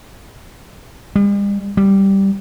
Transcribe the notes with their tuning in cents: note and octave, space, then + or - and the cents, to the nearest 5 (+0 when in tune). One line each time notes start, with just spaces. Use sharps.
G3 +45
G3 -5